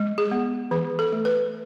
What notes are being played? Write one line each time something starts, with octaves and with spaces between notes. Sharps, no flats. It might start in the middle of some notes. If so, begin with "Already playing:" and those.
Already playing: G#3
G#4
B3
E3 G#4
A4
A3
B4